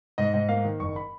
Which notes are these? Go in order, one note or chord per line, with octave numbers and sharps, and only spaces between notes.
G#2 D#5
G#2 D#5
A#3 F5
D#3
F#1 C#6
B5